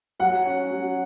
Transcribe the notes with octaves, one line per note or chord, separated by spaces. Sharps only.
F#3 F#5
C#4
F#3